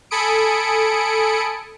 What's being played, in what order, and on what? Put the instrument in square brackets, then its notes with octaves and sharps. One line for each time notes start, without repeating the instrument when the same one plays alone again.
[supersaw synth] A4 G#5 B5 D#6 C#7 D7